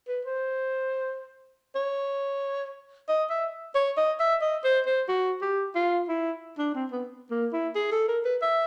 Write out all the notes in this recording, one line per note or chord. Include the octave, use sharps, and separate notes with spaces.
B4
C5
C#5
D#5
E5
C#5
D#5
E5
D#5
C5
C5
F#4
G4
F4
E4
D4
C4
B3
A#3
E4
G#4
A4
A#4
B4
E5